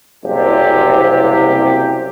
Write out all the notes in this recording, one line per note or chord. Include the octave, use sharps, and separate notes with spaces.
F#1 C2 C3 G4